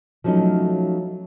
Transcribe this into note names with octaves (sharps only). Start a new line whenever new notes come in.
F3 F#3 A3 C#4 D#4